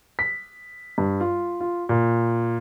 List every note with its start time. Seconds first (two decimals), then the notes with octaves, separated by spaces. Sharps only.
0.19 B6
0.98 G2
1.20 F4
1.60 F4
1.89 A#2